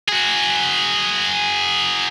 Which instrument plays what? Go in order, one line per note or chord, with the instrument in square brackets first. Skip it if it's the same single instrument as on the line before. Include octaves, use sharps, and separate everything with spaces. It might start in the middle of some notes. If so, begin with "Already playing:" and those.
[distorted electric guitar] F#4 G#4